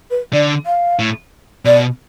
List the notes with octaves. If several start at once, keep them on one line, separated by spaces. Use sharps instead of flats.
B4
D3 D5
F5
A2
B2 D5